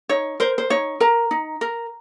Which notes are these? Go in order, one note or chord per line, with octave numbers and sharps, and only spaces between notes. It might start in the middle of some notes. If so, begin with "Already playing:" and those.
D#4 C#5
A#4 C5
C5
D#4 C#5
A#4 A#5
D#4
A#4